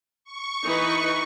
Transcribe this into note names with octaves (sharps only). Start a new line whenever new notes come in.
C#6
E3 D#4 B4